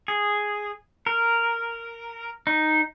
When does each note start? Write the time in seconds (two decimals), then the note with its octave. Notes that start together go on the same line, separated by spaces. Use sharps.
0.08 G#4
1.06 A#4
2.47 D#4